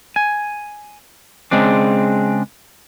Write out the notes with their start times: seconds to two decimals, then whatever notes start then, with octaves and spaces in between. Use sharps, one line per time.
0.16 G#5
1.51 C#3 G#3 C4 D4